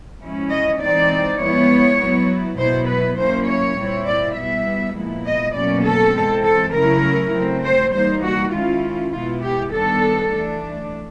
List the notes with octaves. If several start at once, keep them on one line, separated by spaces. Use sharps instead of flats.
F3 G#3 C#4 E4
D#5
E3 G#3 C4 D#4 D5
F3 G#3 B3 E4 C#5
F#3 B3 E4
B2 F#3 B3 E4 C5
B4
F#3 A#3 C#4 E4 C5
C#5
A#2 G3 C4 E4
D5
B2 G3 B3 E4 E5
A#2 F3 G#3 B3 E4
D#5
B2 F#3 A#3 C#4 D5
A4
E3 G#3 C4
A4
C#3 F#3 A3 C#4 E4 A#4
F#3 A3 C4
C5
E3 G3 A#3 D#4 C5
F#4
D#3 G#3 C#4 E4 F4
B2 G#3 B3 E4 F4
G4
D#3 G3 B3 D4 A4
E3 A3 D4